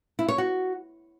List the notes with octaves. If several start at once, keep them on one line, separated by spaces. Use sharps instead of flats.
E4
C#5
F#4